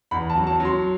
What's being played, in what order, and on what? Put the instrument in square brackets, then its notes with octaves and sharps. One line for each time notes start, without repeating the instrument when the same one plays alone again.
[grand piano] E2 B5
A5
F#3
A5
F#3
C6